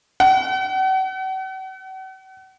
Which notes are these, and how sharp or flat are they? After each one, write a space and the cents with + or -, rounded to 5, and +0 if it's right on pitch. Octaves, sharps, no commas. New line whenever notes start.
F#5 +40